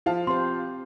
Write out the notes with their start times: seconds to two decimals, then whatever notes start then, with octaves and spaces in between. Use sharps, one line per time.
0.06 F3 F4 F5 A5
0.27 C4 G4 C5 C6